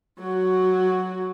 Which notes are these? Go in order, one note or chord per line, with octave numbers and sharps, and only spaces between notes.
F#3 F#4